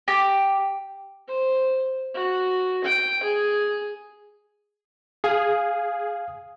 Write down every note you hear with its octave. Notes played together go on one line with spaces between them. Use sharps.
G4
C5
F#4
G5
G#4
G#4 F5 D#6